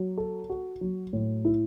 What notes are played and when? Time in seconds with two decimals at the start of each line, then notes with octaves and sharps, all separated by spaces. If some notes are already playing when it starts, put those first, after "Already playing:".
Already playing: F#3
0.18 A4
0.49 F#4
0.81 F#3
1.13 A2
1.45 E4